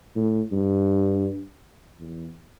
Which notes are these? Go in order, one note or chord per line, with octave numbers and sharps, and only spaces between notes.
A2
G2
E2